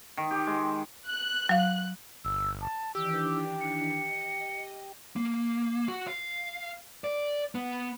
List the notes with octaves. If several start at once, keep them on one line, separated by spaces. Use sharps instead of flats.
D#3
G4
G#3
F#6
F#3 F5
G1 E6
A5
D#3 E3 D4 G4 E6
C#7
D#5
A#3
F#4
F5
D5
B3